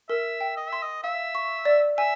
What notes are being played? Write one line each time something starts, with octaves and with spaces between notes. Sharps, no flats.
A#4 E5
G5
D#5
E5 C6
D#5
E5 F5
C#6
D5
E5 G#5